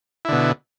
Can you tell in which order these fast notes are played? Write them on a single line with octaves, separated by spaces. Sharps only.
E4 D3 B2